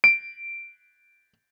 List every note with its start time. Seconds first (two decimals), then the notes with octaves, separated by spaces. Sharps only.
0.04 D7